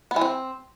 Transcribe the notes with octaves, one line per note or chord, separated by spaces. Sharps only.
B3
E3
C4